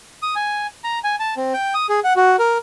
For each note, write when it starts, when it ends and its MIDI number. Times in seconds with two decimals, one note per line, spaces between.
0.22 0.35 87
0.36 0.67 80
0.84 0.99 82
1.04 1.16 80
1.20 1.34 81
1.37 1.53 60
1.54 1.74 79
1.74 1.86 87
1.89 2.00 68
2.04 2.13 78
2.16 2.36 66
2.39 2.58 70